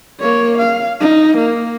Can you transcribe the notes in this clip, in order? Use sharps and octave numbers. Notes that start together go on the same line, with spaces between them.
A#3 C#5
F5
D#4
A#3